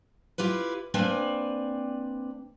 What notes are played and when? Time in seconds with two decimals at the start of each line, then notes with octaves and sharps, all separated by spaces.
0.38 E4 F4 G4 B4
0.94 A#3 C4 D4 B4 D5 G#5